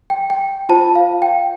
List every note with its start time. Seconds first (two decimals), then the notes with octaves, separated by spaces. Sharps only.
0.10 G5
0.30 G5
0.69 F4 C5 A5
0.95 F5
1.22 G5